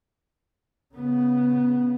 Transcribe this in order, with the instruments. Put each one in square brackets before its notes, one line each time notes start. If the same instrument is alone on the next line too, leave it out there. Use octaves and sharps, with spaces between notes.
[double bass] C#3 B3